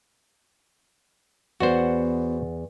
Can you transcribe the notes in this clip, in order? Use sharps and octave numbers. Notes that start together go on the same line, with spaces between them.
E2 B3 F#4 C5 D5 F#5